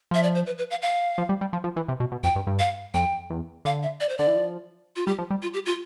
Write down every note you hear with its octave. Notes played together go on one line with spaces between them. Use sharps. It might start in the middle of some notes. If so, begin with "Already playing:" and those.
F3 E5
D5
C5
B4
B4
F5
F5
F3
G3
G3
F3
F3
E3
C3
B2
B2
F2 G5
G2
G2
F5
F2 G5
E2
D3 F5
E5
D5
C5
D3 D5
E3
F3
F4
G3 G4
F3
G3
F4
G4
F4